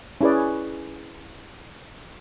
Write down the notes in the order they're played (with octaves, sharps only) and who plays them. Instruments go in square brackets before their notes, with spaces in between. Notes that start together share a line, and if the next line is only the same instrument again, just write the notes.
[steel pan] C#4 E4 G#4 B4 D5